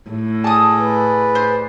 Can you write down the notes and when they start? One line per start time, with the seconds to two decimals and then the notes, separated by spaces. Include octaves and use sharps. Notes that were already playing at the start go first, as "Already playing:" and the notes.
0.10 A2
0.44 G#4 D5 A5 D#6
0.80 B4
1.35 C5